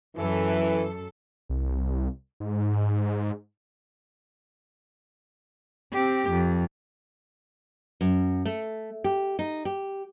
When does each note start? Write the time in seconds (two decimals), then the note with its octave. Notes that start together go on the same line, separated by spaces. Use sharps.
0.16 F#2 E3 A4
1.49 C2
2.40 G#2
5.93 C4 G4
6.30 F2
8.01 F#2
8.46 A3
9.04 G4
9.39 D#4
9.65 G4